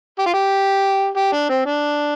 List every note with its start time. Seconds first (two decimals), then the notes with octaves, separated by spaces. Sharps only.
0.19 G4
0.26 F4
0.34 G4
1.16 G4
1.33 D4
1.49 C4
1.66 D4